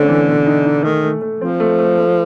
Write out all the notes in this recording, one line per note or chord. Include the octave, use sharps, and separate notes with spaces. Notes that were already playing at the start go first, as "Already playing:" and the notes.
Already playing: D3 A3 C4 C#4
E3
B2
D#4
D#4
D#3 A3
A3
A3
F3 C4
A3
A3
A3